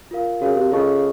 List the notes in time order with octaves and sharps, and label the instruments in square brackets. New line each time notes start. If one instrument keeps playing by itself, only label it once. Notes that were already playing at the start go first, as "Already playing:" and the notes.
[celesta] F4 A#4 F5
[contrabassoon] C#3 [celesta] F#4 A#4 F5
[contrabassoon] C3
[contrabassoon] C#3 [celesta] F4 A4 D#5 A5 C#6